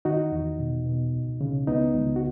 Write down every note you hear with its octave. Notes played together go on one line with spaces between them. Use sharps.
D#3 D#4 F#4
E2
B2
B2
C#2
C#3
C#2 B3 D#4
C#2
F#4